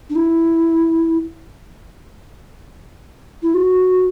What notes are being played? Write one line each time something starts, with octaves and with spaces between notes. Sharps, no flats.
D4
E4
E4
F#4